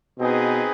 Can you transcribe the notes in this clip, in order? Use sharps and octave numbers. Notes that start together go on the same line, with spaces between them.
B2 C4 D#4 G#4 B4